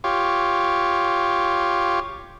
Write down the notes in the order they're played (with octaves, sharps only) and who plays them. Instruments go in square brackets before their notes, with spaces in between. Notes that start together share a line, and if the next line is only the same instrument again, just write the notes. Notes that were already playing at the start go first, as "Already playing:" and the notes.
[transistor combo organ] F4 G4 C#5